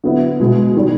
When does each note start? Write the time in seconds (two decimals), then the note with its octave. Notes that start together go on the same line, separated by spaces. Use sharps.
0.04 D3 F#3 B3 E4
0.40 B2 G#3 B3
0.76 D#3 G3